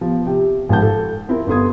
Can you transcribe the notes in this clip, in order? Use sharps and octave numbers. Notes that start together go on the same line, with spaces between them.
F3 B3
C3 G5
G#1 F3 A#4 F#5 A5 G6
A4
C4 E4 F4 A#4
G1 B3 A4 C6 D#6 G#6